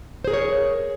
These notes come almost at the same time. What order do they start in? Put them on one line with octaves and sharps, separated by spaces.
C5 G#4 A#4 C#5